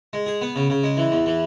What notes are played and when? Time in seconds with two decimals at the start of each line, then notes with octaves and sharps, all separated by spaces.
0.13 G#3
0.26 G#4
0.42 B3
0.56 C#3
0.70 C#3
0.84 G#3
0.97 E3
1.12 E2
1.26 E3